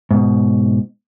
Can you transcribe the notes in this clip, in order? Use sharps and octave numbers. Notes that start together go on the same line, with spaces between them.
G#2 B2